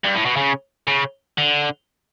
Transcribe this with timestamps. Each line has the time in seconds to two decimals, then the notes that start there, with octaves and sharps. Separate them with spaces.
0.04 G2
0.15 A2
0.25 B2
0.36 C#3
0.87 C#3
1.38 D3